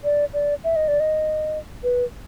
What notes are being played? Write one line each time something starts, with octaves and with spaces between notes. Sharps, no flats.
D5
D5
E5
D#5
D5
D#5
B4